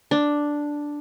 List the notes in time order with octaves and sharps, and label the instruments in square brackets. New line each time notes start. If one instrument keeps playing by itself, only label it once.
[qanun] D4